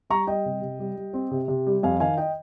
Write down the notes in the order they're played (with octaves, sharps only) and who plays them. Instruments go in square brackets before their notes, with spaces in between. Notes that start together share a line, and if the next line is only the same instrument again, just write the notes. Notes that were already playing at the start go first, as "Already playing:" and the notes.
[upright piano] G3 A#5 C#6
G3 D#5 G5
C3
C3
G3
G3
C4
C3
C3
G3
F2 F5 G#5
D#3 F5 G#5
D#5 G5